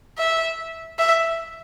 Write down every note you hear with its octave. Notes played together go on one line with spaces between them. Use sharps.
E5
E5